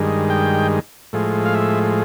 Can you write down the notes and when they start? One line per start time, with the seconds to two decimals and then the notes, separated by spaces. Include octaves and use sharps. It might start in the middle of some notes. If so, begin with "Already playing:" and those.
Already playing: G2 D#3 G#3
0.30 G5
1.13 A2 F3 G#3
1.46 F5
1.54 E5